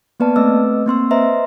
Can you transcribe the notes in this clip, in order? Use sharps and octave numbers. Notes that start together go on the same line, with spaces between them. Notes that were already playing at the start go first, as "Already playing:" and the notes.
A#3 B3 B4 D5 A5
A3 C4 B4 D#5 D6 E6
A#3 C4 C6 E6
B4 C5 D#5 E5 A#5 C6